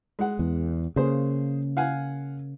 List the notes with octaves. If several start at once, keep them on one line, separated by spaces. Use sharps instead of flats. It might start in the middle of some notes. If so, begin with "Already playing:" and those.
G#3 F#5
E2
C#3 A#3 G#4 C5
F5 F#5 G#5